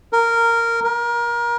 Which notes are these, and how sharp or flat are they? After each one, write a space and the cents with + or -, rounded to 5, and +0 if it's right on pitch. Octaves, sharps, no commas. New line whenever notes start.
A#4 -10
A#4 +25